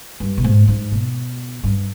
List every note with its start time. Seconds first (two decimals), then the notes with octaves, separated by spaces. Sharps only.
0.20 G2
0.38 B2
0.44 G#2
0.68 G#2
0.92 B2
1.64 G2